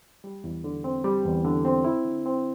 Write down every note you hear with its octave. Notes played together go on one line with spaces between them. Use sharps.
G3
E2
D3
C4
G3
E2
D3
C4
E4
D3
C4